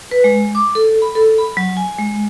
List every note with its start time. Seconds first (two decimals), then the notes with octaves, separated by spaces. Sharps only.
0.11 B4
0.24 G#3
0.55 D6
0.75 A4
1.02 B5
1.15 A4
1.38 B5
1.57 F#3
1.77 G#5
1.98 G#3